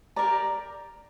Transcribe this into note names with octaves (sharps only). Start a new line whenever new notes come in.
G4 A#4 D5 A#5